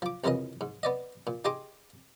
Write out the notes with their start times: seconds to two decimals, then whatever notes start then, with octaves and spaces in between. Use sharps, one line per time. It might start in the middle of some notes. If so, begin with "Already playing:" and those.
0.02 F3 D6
0.24 C2 F2 C#3 E3 A#4 D#5
0.61 G#2
0.83 B3 D5 D#5
1.27 A#2
1.45 D#4 G4 G#4 D#5 C6 D6